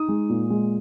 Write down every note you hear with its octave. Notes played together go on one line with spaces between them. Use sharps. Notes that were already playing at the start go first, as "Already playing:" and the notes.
Already playing: D#4 D#6
G#3
A#2
G#3